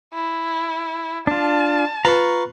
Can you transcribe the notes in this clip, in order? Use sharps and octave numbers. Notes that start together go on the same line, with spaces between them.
E4
D4 F4 A5
F4 B4 A#5 C#6